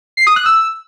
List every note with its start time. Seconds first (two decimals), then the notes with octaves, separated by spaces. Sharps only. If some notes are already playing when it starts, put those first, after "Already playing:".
0.17 C7
0.27 D#6
0.36 F#6
0.46 E6